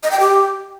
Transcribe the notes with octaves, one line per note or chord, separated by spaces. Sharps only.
D#5
G5
G4